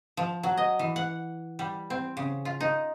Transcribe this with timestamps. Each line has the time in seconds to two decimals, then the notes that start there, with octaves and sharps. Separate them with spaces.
0.17 F3
0.43 F#3
0.57 D#5
0.79 E3
0.96 F#5
1.59 G3
1.90 C4
2.17 C#3
2.45 F4
2.61 D#4